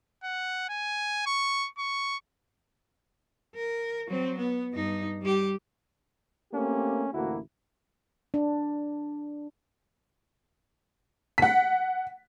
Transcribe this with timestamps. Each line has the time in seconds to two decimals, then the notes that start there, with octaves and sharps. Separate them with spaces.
0.24 F#5
0.69 G#5
1.26 C#6
1.78 C#6
3.55 A#4
4.08 F#3 C4
4.38 B3
4.73 G2 D#4
5.22 G3 G4
6.52 A3 A#3 C4 C#4 G4
7.13 A1 D2 A#3 E4 F#4
8.34 D4
11.38 F#5 B6